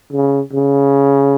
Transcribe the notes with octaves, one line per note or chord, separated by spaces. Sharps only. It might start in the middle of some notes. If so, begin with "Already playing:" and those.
C#3
C#3